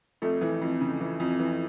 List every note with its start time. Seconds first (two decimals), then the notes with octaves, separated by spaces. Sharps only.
0.22 F2 A3
0.41 E3
0.61 F2
0.81 C#3
1.00 E3
1.20 F2
1.39 E3